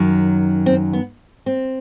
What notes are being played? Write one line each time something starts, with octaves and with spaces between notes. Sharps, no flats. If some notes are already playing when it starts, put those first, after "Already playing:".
Already playing: F#2 D#3 F#3
C4
B3
C4